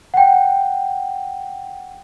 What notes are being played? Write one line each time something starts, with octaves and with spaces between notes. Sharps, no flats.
F#5 G5